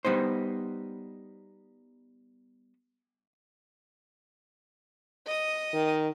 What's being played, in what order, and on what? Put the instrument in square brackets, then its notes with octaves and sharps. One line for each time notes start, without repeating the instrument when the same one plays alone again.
[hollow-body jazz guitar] G3 B3 D#4 C5
[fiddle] D#5 D#6
[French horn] D#3